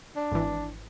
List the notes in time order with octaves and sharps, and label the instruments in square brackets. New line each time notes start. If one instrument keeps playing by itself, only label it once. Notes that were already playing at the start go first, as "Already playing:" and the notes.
[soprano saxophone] D4
[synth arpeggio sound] G#1 E3